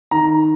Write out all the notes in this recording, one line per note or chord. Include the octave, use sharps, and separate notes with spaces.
D#3 A#5